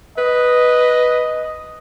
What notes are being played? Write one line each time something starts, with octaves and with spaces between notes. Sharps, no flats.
B4 D#5